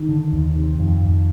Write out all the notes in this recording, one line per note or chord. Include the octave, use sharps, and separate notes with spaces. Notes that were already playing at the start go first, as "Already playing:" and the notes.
Already playing: D#3
D3
D#2
C3
F2
F2